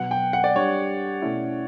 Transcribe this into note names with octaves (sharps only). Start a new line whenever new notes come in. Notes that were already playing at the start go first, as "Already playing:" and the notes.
Already playing: B2 F#3 B3 F#5
G5
F#5
D5
G3 D4 G4 C#5
B2 A3 C#4 E4